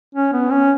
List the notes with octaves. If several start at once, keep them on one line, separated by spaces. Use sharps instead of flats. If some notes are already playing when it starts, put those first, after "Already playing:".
C#4
B3
C#4